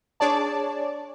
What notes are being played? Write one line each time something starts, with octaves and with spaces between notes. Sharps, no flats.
D4 G#4 C#5 D5 A5